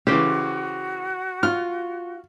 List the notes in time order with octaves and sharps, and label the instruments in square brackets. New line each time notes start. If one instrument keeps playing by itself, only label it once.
[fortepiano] C#3 E3 [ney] F#4 [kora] G4 C5 G5
[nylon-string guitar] F4 [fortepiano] F6